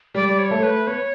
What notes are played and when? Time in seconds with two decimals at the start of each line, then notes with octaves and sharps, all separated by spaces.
0.14 G3 D5
0.29 D5
0.39 C#5
0.51 A3
0.63 B4
0.87 B3 C#5